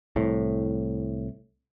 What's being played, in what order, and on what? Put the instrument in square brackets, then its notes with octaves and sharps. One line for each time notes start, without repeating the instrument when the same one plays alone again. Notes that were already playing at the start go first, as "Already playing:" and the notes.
[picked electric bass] C2 A2